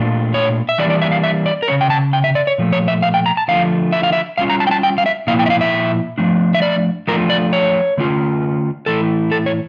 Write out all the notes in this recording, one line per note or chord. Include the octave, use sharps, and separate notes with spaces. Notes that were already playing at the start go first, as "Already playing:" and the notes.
Already playing: A#2 A3 D4 F4
C#5
E5
E3 G3 A#3 D4 D5
D5
E5
F5
E5
D5
A#4
C#3 F3 C#4 C#5
G5
A5
G5
E5
D5
C#5
A#2 F3 A3
C#5
E5
F5
G5
A#5
A5
D3 F3 A3 D4 F4 F5
E5
F5
E5
A2 G3 C#4 F4 F5
A#5
A5
G5
A5
G5
F5
E5
A#2 F3 A#3 E4 F5
G5
E5
F5
E5
F3 A3 D4
E5
D5
F3 A3 D4 F4 A#4
D5
C#5
D3 A3 C#4 F4
A2 E3 A3 E4 A4
A4
C#5